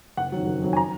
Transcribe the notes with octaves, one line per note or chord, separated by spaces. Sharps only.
F#1 F#5
F2 D#3 F#3
F#1
F2 D#3 F#3
G#5
A#5